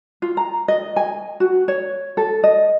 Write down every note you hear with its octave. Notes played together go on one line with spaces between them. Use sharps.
F4
A#5
D#5
G#5
F#4
C#5
A4
D#5